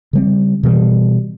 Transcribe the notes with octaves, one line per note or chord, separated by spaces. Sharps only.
C#3 G3 C4
B2 E3 G3